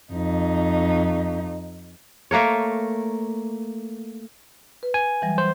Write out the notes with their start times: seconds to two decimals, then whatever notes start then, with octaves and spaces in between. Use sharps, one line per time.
0.13 F2 D#4
2.31 A3 A#3 A#4 C#5
4.83 B4
4.94 G#5
5.22 E3 F#3 G3
5.38 C5